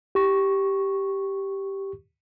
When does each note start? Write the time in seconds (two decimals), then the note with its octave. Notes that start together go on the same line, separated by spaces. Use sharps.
0.15 G4 C#6